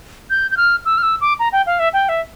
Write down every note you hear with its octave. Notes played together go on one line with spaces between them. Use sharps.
G6
G6
F6
E6
F6
E6
D6
A#5
G5
F5
E5
G5
E5